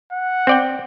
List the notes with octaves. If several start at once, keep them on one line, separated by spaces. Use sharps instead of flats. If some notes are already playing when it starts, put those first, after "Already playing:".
F#5
C4 D5 G5